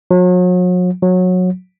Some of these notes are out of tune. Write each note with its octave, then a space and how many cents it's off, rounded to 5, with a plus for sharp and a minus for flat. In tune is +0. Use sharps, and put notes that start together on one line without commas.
F#3 -40
F#3 -20